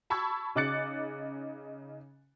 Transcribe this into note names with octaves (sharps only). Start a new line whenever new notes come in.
A5 B5 C#6 E6 G#6
C#3 D#4 D6 F#6 A6 C#7